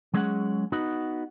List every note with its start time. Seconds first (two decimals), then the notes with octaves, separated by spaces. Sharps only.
0.14 F#3 G#3 C#4 G#4 F5 F#5
0.72 B3 D#4 F#4 F#5